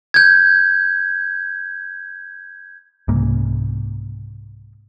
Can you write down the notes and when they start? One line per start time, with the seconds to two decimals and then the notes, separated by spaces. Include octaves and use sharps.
0.14 G6 G#6
3.08 C2 G#2 C#3 A#3